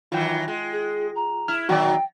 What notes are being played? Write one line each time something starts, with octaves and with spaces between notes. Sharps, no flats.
D#3 E3 F#3 F4 G5
G#3
G#4
A#5
E4 F6
A#2 D#3 F#3 F#4 D5 G5